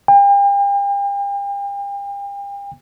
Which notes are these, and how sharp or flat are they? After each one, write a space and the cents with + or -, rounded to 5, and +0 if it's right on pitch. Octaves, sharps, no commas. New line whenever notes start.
G5 +40